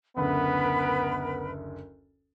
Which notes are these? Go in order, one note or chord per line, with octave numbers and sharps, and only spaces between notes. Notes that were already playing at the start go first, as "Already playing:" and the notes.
F#1 D2 B3 A#4 B4 B5